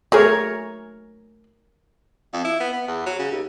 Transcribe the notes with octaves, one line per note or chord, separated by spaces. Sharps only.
F#3 A3 G#4 A#4 C#5
F2
E4
B3
B3
E2
F#3
C#3
D#2